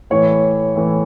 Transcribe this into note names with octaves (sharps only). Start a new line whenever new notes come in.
A2 E3 C#5
A2 E3